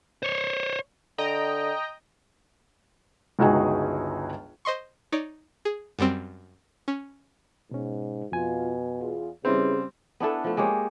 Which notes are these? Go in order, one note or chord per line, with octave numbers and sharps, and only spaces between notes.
C5 C#5
D3 D#5 G5 A#5
G1 C#2 D#4 F#4 G#4 G#5
C5 D#5 C6 C#6
D#4 C#5 D5 D6
G#4
F#2 G3 C4
C#4
G#2 B2 C#4
F2 B2 F4 G#5
E2 F4 G#4
C#3 G3 C4 C#4 E4 G#4 B4
B3 D4 E4 A4
F3 A3
G#3 A#3 G4 C#5